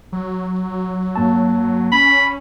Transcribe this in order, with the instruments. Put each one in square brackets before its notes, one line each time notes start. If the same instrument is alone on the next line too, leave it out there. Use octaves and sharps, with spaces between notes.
[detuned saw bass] F#3
[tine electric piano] G2 A#3 A5
[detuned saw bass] C#4 [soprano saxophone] B5